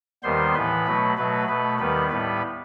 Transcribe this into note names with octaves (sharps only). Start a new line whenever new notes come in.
D#2 D#3 G3 B3 C5 C6
A2 E3 B3 B4 B5
B2 F#3 A3
B2 F#3 A3 B4 B5
B2 A3 B4 B5
D#2 D#3 G3 B3 B4 B5
A2 G3 B3 B4 B5